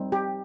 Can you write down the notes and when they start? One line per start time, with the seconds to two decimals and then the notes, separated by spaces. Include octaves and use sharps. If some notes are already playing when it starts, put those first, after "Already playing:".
Already playing: G3 C4 D#4
0.12 G4